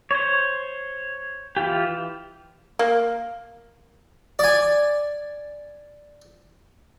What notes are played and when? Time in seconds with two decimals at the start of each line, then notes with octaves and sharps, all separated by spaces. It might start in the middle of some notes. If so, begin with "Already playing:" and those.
0.11 C5 C#5
1.57 E3 F4 G4
2.79 A#3
4.39 D5 G#5